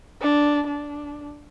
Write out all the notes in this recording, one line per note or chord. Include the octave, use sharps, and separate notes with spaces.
D4
D4